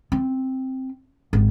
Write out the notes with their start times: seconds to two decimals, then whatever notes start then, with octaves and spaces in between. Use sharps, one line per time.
0.12 C4
1.33 G#1